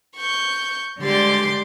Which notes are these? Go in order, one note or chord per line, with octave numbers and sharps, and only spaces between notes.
C#6 G6
D3 G3 G#3 G4 C6 D6